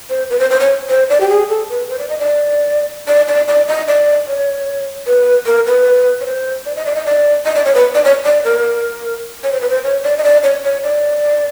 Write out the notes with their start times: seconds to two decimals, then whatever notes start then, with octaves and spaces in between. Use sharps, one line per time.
0.10 C5
0.30 B4
0.40 C5
0.50 C5
0.60 C#5
0.90 C5
1.10 D5
1.21 G4
1.29 G#4
1.49 A4
1.69 B4
1.89 C5
1.99 D5
2.09 D#5
2.19 D5
3.08 D5
3.28 D5
3.48 D5
3.68 D#5
3.88 D5
4.27 C#5
5.07 B4
5.46 A#4
5.67 B4
6.21 C#5
6.26 C5
6.66 D5
6.76 D#5
6.86 D5
6.96 D#5
7.06 D5
7.46 D#5
7.55 D5
7.65 C#5
7.75 B4
7.95 D5
8.05 C#5
8.25 D5
8.45 A#4
9.44 C#5
9.52 C5
9.61 B4
9.69 C5
9.84 C#5
10.04 D5
10.18 D#5
10.24 D5
10.43 C#5
10.64 C#5
10.83 D5